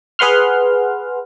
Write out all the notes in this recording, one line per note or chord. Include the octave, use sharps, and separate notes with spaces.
G#4 B4 F#5 C6 F6